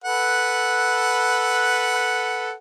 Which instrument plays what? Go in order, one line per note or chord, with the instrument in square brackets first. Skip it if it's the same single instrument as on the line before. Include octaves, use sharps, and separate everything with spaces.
[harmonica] A4 B4 F#5